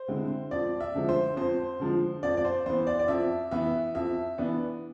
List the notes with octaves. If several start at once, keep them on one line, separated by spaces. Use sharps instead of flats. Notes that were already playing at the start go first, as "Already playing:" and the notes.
Already playing: C5
D3 G#3 C4 E4
F2 D5
E5
D3 F3 G#3
C5
F2 C5
D3 F3 G#3
F2 D5
D5
C5
E3 B3 C5
D5
D5
F2 E5
E3 B3 E5
F2 E5
E3 B3 D4